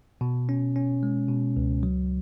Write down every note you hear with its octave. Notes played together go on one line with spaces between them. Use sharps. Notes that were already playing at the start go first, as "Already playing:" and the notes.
B2
C#4
C#4
G#3
B2
C#2
F#3